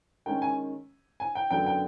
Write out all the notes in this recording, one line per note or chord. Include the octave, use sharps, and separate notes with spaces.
D#3 G#3 C#4 G5
G#5
G#5
G5
F#2 D3 F#3 B3 G5
G5